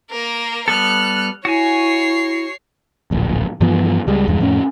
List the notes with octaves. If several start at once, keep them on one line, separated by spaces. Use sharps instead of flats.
A#3 A#4
G3 B3 A4 F6 F#6
E4 F#4 C#5 G#5 C7
D1 A#1
G2 E3 F3 B3
C#2 G3 G#3
D#1 E2 G2 G#3
F2 A2 A#3 C#4